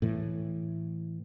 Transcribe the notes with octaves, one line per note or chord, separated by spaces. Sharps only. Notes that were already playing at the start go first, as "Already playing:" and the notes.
A2 E3